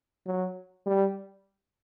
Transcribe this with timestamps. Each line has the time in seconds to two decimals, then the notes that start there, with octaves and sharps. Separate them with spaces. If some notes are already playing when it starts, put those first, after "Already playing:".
0.26 F#3
0.86 G3